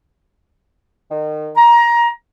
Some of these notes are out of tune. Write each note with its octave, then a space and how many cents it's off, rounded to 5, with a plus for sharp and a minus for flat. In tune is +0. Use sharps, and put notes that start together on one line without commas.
D#3 -30
A#5 +20